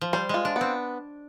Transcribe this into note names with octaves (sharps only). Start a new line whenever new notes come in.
F3
G3 C5
G#3 F4
D4
B3
C4